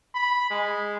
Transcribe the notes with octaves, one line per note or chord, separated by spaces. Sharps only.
B5
G#3